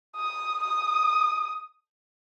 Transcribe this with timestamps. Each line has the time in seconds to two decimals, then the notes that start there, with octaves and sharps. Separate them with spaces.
0.16 D#6
0.64 D#6